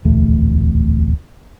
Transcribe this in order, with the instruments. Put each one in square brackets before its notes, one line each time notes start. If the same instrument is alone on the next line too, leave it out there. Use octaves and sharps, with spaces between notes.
[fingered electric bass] D1 A#1 E2 A3